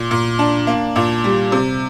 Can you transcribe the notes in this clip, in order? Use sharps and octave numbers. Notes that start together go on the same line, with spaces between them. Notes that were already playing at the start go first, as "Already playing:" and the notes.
Already playing: A#2
A#2
D4
A#3
A#2
G3
C3